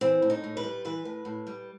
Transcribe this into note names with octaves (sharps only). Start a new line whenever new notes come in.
E3 C4
A2
D#4
A2
B4
G3
E3 B4
A2
A2
G3